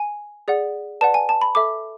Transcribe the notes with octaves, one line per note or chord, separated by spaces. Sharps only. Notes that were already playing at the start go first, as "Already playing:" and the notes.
Already playing: G#5
G#4 D5 F#5
B4 D5 F#5 A5
G#5
A5
B5
A4 E5 D6